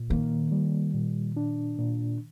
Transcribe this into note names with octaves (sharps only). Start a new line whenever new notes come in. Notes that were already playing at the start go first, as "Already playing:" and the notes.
Already playing: A#2
D#3 A#3
G3
A#2
D4
A#2